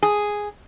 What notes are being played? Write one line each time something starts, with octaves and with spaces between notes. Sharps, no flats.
G#4